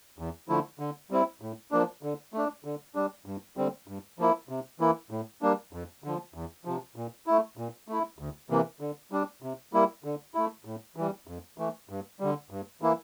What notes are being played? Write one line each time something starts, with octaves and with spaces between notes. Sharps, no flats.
E2
D3 F3 A3 E4
D3
G3 C4 E4
A2
F3 A#3 D4
D3
A3 D4
D3
G3 D4
G2
D3 G3 C4
G2
F3 A#3 E4
C3
E3 A#3 E4
A2
G3 A#3 D4
F2
D3 F3
E2
C3 F3
A#2
A3 E4
A#2
A3 E4
D2
C3 E3 A#3
D3
G3 D4
C3
G3 A#3 E4
D3
A3 E4
A2
E3 G3
F2
E3 A3
G2
D3 G3
G2
E3 A#3 E4